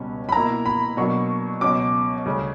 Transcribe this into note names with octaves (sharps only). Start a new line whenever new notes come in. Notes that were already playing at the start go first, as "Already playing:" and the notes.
Already playing: C#2 B2 G3 C#4
B5
B2 A#3 E4 A#5
B5
B2 F#3 A#3 D4 C#6
C#2 B2 F#3 C#4 D6
D2 C#3 G3 C#4